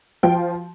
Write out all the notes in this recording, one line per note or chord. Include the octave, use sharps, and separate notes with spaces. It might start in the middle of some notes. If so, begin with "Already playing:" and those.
F3 G5